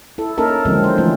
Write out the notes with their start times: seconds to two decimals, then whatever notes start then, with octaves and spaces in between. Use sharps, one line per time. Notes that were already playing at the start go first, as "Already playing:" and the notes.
0.18 E4 A4
0.38 A#3 C#4 D#4 A4 A#4 E5
0.65 D3 D#3 F3 F#3 G#3 C4
0.84 C5
0.98 E3 F3 A3 C#4